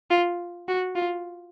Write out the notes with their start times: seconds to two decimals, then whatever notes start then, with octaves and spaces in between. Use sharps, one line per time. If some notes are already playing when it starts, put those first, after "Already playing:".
0.11 F4
0.68 F#4
0.95 F4